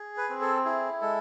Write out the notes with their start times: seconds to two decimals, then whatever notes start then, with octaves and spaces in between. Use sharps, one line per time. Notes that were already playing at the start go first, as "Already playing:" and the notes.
Already playing: G#4
0.17 B4
0.29 C4
0.41 A4
0.65 E4 G#4
1.01 G#3 A4